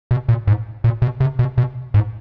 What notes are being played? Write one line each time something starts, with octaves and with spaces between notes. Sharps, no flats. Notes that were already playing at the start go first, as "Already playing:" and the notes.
B2
A#2
G#2
A#2
B2
C3
B2
B2
G#2